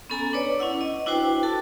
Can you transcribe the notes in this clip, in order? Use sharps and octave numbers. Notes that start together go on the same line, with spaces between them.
B3 C#4 A4 G#5 A#5
D4 B4 C#5 D5
C#4 E4 F#5 E6
D#5
D4 E4 F#4 B4 C5 G5
F#4 A4 A5